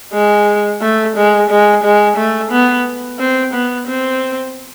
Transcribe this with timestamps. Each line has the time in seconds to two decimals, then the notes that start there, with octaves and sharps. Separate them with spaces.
0.13 G#3
0.81 A3
1.16 G#3
1.50 G#3
1.83 G#3
2.17 A3
2.51 B3
3.19 C4
3.53 B3
3.87 C4